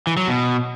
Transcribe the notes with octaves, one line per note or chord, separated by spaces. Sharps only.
E3
F#3
B2